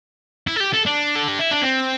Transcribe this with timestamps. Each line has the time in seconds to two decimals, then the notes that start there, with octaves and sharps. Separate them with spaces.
0.47 E4
0.56 A4
0.60 G4
0.73 A4
0.86 D4
1.16 A4
1.28 G4
1.39 E4
1.51 D4
1.62 C4